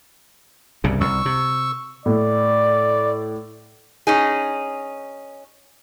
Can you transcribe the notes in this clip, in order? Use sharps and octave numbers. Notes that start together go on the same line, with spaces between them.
C2 G2 C#3
C2 C#6 E6
C3
A2 D5
C#4 D#4 G#4